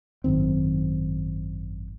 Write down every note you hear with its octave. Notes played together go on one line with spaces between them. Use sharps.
G#1 F#2 D#3 C4